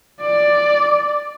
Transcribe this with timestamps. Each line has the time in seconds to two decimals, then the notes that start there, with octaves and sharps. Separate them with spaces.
0.21 D5